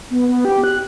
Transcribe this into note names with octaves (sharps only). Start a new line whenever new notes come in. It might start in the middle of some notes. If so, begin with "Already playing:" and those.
B3
B3
G4
F#6